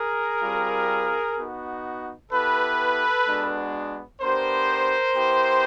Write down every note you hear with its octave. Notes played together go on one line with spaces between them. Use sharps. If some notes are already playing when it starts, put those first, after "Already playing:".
Already playing: G#4 A#4
G3 C4 F4
B3 D#4 F#4
B3 E4 G4 A4 B4
G#3 B3 D4 F#4
B3 D4 G4 A#4 C5
B3 E4 G4